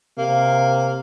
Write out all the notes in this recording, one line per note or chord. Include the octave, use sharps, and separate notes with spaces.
C3 A#3